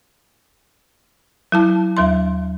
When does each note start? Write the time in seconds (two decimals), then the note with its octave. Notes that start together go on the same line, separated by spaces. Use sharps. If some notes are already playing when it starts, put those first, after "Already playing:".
1.52 F#3 E4 A5
1.97 D#2 F#3 E5 C6